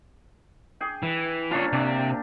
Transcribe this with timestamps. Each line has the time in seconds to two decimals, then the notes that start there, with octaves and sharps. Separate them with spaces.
0.80 G#4 G5
1.03 E3
1.51 A#2 C#4 D4 F4 C#5
1.73 C3 D4 G4